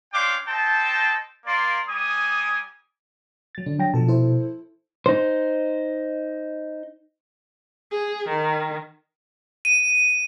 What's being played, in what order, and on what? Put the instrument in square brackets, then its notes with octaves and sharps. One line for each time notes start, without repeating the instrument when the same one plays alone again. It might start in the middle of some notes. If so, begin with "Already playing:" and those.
[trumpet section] C#4 D4 F5 G5 C6 D6
A4 C5 D#5 G5 A5
A#3 D5 C6
G3 G#5 D6 D#6
[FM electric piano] F#3 A6
[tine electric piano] D3 [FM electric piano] D4
[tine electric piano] F#3 G5 A#6
[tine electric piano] B2 [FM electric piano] F3 A4 A5
[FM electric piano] E4 A4 C5
[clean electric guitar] D#4 C5
[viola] G#4
D#3
[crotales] D#7